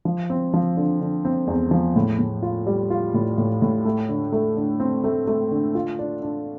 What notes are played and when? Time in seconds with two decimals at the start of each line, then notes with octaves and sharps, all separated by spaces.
0.05 F3
0.30 C4
0.54 F3
0.77 D3
1.01 D3
1.25 C4
1.47 E2
1.71 F3
1.96 A2
2.19 A2
2.42 F4
2.67 G3
2.90 F4
3.14 A2
3.38 A2
3.62 A2
3.85 A3
4.09 D3
4.32 A3
4.56 D3
4.80 C4
5.04 A3
5.27 A3
5.51 D3
5.75 F4
5.99 D4
6.23 D4